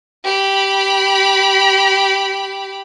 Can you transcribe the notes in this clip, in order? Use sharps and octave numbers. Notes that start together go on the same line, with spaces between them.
G4 B5